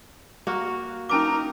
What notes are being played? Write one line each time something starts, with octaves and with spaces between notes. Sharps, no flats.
A#3 F#4
C#4 D#4 A#4 A5 D6